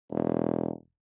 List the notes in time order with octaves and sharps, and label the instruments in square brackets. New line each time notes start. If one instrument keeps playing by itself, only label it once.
[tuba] E1